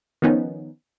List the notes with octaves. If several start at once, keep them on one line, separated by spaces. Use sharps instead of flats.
D#3 F3 B3 C#4 D#4